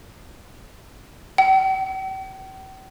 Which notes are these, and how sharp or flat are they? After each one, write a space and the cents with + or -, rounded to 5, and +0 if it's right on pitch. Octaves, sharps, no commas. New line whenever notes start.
G5 -45